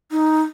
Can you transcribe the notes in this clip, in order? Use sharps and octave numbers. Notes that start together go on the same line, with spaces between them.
D#4